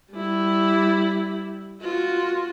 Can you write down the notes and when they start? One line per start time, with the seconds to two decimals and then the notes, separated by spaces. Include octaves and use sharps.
0.13 G3 E4
1.82 F4 F#4